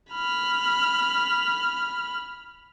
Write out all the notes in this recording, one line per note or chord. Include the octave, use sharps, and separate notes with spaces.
B5 F6